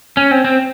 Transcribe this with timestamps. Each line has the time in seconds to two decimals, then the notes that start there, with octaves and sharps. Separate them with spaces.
0.17 C#4
0.31 C4
0.45 C4